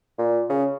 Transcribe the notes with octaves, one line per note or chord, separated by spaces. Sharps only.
A#2
C#3